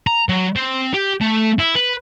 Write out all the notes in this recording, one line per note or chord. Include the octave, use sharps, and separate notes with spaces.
A#5
F#3
C4
G4
A3
E4
B4